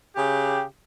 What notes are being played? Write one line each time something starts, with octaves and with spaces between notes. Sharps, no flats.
C#3 G4